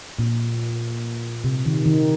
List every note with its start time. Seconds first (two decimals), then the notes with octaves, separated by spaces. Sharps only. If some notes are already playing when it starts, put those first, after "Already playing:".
0.19 A#2
1.44 C3
1.66 D#3
1.86 D#3